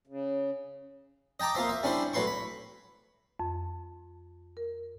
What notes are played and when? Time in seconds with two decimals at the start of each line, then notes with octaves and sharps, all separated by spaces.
0.07 C#3
1.40 D#5 G5 A5 A#5 D6
1.55 A#3 F4 C5 E5
1.69 E5
1.83 G3 C#4 D4 E4 C5
2.13 A2 F#3 B4 C6 C#6
2.27 B5
3.39 F2
4.57 A#4